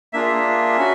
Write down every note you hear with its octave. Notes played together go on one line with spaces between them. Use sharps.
A#3 D4 F4 G#4 E5
C#4 F#4